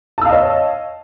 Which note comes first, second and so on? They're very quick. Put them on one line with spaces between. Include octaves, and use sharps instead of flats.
A5 E6 F5 D#5 C#5